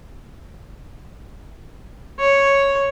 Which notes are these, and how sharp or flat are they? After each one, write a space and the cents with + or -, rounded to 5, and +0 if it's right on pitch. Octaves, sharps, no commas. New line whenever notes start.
C#5 +0